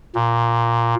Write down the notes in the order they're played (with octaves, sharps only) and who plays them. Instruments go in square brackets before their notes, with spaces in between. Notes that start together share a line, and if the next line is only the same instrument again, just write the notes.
[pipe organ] A#2